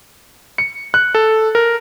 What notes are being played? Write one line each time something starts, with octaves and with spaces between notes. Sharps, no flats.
C#7
F#6
A4
A#4